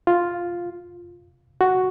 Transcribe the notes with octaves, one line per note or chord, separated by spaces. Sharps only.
F4
F#4